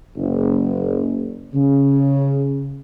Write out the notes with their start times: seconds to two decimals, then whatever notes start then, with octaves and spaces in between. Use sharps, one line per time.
0.17 F#1
1.54 C#3